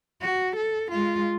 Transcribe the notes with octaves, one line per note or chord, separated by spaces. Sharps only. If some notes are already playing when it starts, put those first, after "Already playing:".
F#4
A4
G#3 F4